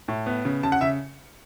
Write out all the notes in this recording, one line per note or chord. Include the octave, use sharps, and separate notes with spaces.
A2
B3
C#3
C#3 A5
F#5
C#3 E5